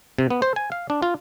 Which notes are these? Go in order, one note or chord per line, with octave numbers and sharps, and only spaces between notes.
C3
B3
C5
G#5
F5
D4
F4